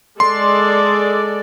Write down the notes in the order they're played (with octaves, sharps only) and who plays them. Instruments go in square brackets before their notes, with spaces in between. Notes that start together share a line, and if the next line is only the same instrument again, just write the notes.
[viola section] G#3 A4 D5 [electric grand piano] C6